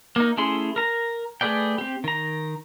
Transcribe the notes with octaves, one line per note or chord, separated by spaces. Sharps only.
A#3 D#4
A3 C#4 E4 G#4 C6
A#4 A#5
A3 G#4 B4 D5 G5
C4 G4
D#3 A#5